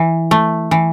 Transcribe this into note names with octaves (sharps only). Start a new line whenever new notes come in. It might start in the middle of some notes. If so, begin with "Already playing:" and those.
Already playing: E3
A3
E3